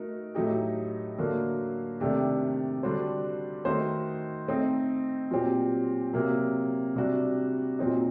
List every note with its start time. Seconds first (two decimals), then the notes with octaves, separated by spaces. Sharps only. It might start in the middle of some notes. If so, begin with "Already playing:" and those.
Already playing: A3 D#4 F#4 A#4
0.35 A2 F#3 A3 D#4 G4
1.18 D3 F#3 A#3 F#4
2.00 C3 D#3 A3 D4 G4
2.83 D3 G3 D4 F#4 C5
3.65 D#3 A3 D#4 F#4 C5
4.48 A3 C4 D#4
5.31 A#2 F#3 C4 G4
6.13 C3 F#3 A#3
6.96 C3 G3 D4 F#4
7.79 A#2 F#3 C4 D#4